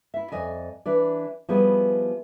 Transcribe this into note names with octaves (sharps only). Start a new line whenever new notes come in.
E4 E5
F2 D5 D#5 G#5
E3 D4 B4 D5
F3 G3 B3 E4 G#4